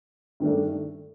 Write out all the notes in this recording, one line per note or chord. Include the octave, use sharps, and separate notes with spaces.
G2 D#3 A3 D4